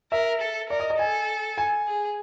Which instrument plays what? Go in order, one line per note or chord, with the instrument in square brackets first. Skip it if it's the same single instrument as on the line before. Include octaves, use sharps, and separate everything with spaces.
[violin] A#4 [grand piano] E5
[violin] A4
[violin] A#4 [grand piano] D5
[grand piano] D#5
D#5
[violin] A4 [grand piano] G#5
[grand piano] G#5
[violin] G#4